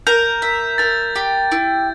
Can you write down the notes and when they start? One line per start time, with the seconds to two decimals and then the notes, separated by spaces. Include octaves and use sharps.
0.07 A#4 G6
0.42 E5
0.78 A#4 A6
1.16 G4
1.52 E4